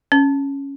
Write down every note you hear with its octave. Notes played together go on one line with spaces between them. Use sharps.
C#4